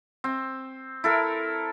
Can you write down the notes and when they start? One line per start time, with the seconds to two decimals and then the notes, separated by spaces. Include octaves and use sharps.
0.24 C4
1.04 E4 A4 A#4